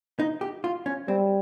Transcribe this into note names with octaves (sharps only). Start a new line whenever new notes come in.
D#4
G4
F4
C#4
G3 C4